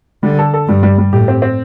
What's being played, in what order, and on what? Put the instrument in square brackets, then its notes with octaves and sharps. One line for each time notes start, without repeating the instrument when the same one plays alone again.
[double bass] D3 [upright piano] G3
[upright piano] A4
A4
[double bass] G2 [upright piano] G3
[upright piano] G3
G3
[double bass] A2 [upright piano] G4
[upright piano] C4
C4